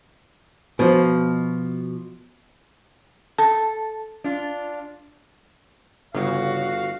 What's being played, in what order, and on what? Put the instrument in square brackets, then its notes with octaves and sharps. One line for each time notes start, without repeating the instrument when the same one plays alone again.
[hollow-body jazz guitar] B2 F3
[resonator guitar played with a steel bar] A4 [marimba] A5
[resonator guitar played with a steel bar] D4 F4
[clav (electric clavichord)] G1 [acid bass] C#3 [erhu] F#4 [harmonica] F5